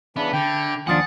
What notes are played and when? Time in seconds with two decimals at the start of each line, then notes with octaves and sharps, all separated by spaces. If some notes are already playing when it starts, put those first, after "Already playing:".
0.16 C#3 E3 B3 D4 E5 B5
0.33 D3 G5
0.87 D#2 F3 D4 F4 F#5 G#5 D#6 A6